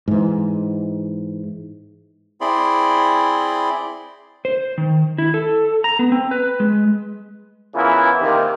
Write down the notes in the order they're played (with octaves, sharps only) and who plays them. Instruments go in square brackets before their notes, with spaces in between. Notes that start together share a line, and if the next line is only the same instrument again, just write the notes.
[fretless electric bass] G#2 E3
[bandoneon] C4 E4 G#4 D5 B5 C6
[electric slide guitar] C5
D#3
E4
A4
A#5
B3
C4
B4
G#3
[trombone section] C#3 E3 B3 E4 F4 A#4
C3 D#3 A#3